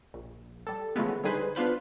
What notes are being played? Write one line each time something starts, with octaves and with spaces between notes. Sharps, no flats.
A#1
G3 A4
C#3 E3 F3 G#3 A3 B3
D3 G3 D#4 G#4 B4 C5
B3 D4 F4 B4 C5